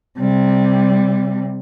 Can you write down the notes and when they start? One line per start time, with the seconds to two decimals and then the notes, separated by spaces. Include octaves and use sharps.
0.18 C3 G3